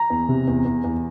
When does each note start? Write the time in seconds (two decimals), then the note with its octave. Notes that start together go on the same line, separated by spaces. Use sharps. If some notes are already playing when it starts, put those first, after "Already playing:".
Already playing: A#5
0.10 E2
0.29 C3
0.48 E2
0.65 E2
0.84 E2